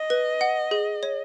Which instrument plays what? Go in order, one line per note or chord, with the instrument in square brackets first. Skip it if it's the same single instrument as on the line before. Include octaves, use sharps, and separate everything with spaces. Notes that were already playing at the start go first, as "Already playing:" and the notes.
Already playing: [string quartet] D#5
[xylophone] B4
F#5
G#4
C#5